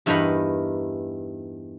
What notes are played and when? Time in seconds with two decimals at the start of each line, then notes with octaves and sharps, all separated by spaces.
0.06 E2 G2 E3 D#4 A#4 B5